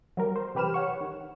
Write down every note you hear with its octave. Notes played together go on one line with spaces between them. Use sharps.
F#3 G3 A#4
C5
C3 E3 G4 B4 F6 E7
C#5 F#5 C#6
D#3